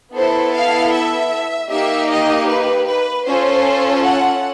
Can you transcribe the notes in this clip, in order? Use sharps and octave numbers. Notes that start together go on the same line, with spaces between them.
B3 E4 A4 C5
F5
E5
A#3 D#4 G4 E5
D#5
B4
B4
C#4 F4 A4 C5
F#5